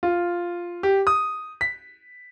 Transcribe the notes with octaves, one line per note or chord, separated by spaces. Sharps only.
F4
G4
D#6
B6